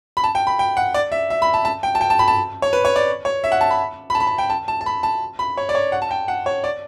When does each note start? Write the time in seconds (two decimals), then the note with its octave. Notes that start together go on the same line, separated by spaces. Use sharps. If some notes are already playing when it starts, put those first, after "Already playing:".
0.17 B5
0.24 A5
0.35 G5
0.47 B5
0.59 G5
0.77 F#5
0.94 D5
1.12 E5
1.30 E5
1.42 B5
1.54 A5
1.65 A5
1.83 G5
1.95 A5
2.01 G5
2.10 A5
2.19 B5
2.28 A5
2.62 C#5
2.73 B4
2.85 C#5
2.96 D5
3.25 C#5
3.44 E5
3.52 F#5
3.61 A5
3.71 B5
4.10 B5
4.15 A5
4.20 B5
4.27 A5
4.38 G5
4.50 A5
4.68 A5
4.81 A5
4.86 B5
5.03 A5
5.39 B5
5.57 C#5
5.69 D5
5.75 C#5
5.92 F#5
6.02 A5
6.11 G5
6.28 F#5
6.46 C#5
6.64 D5